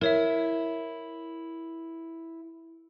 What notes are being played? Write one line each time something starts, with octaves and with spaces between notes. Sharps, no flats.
E4 A#4 C#5 E5